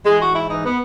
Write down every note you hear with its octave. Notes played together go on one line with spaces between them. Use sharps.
E3 G#3
F#4
G#2
E4
E3 D#4
B3